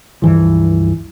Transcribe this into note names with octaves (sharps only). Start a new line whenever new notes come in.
C#2 G2 E3 F3